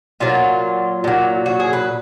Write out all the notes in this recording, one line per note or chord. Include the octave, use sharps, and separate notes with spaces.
A#2 F#3 F4
A#2 F#3
F#4
G#4
B4